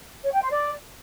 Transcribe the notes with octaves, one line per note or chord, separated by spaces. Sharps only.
C#5
G5
C5
D5